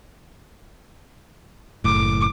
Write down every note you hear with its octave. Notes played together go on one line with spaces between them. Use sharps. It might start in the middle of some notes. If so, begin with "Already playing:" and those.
F#1 A2 D6